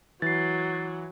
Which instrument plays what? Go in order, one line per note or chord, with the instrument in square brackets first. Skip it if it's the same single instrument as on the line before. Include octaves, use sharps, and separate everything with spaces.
[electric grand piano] E3 [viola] F#3 [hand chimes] A6 C7